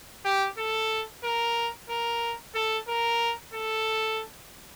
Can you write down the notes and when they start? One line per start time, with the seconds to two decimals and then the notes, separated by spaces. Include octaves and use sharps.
0.25 G4
0.58 A4
1.24 A#4
1.89 A#4
2.55 A4
2.88 A#4
3.54 A4